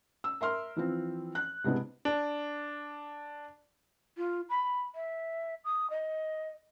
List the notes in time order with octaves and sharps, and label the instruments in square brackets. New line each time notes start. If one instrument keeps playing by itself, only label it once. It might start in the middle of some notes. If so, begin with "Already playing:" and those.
[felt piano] E6
A#4 E5 C6 F6
E3 F3 C4
F#6
C3 G#3 B3 D4 E4
[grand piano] D4
[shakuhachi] F4
B5
E5
D#6
D#5